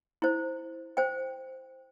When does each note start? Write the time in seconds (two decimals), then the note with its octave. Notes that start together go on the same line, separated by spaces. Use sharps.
0.22 E4 C5
0.97 C5 G5